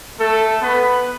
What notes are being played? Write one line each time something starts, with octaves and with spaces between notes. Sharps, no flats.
A3 A4
B3 B4